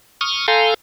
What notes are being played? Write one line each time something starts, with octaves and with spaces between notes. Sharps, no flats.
C#6 D#6 F6
A4 F5 G#5 A#5 C6 G6